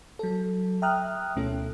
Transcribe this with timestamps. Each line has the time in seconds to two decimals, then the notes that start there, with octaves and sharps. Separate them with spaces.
0.19 F#3 A4
0.82 E5 G5 A#5 D#6 F6 F#6
1.36 D2 B2 A3 C#4 E4 A4